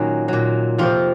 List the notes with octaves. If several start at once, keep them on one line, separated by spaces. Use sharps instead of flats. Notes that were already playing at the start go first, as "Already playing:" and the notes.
Already playing: A#2 D#3 F#3 A#3 C#4 D#4
A#2 F#3
F2 C3 F3 F4